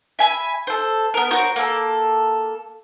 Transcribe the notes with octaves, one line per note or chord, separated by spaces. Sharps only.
E5 G#5 B5
A4 C5
B3 A#4
F#4 A#4 C5 C#5
A#3 A4